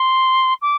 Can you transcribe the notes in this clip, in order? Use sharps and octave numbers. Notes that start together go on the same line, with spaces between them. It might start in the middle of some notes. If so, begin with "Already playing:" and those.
Already playing: C6
D6